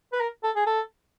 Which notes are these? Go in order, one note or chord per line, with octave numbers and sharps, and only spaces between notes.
B4
A#4
A4
G#4
A4